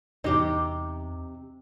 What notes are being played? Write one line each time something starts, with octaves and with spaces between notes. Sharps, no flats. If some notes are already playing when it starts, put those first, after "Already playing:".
E2 C3 D#4 G4